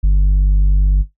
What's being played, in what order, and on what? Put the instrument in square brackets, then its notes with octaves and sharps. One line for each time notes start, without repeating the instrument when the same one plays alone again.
[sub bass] G1